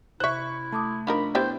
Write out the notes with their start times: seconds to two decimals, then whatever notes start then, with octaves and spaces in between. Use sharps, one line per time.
0.20 C3 E4 C5 E5 C#6 F#6
0.72 A3 A5 D6 D#6
1.07 F3 D4 D#4 A#4 B5
1.35 B3 E4 G4 C5